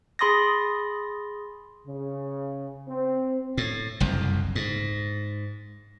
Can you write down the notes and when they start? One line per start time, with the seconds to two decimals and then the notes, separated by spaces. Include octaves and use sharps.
0.19 G#4 B5 C6 D#6 A6 A#6
1.86 C#3
2.88 C4
3.57 A2
4.00 F#1 C2 F2
4.55 G#2